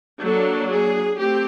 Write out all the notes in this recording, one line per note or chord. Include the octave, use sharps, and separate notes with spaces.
F#3 A#3 D4 A4
G#4
A3 C4 G4